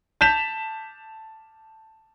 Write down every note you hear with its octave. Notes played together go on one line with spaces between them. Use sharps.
A5 G6 B6 E7 F7